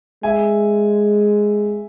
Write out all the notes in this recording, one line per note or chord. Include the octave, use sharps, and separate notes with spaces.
G#3 E5 G#5